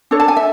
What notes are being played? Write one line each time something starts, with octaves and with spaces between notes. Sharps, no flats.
D4 A4 C#5
A5
G#5
E5